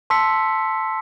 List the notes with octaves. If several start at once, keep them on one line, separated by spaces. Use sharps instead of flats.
A5 C6 E6 B6 C#7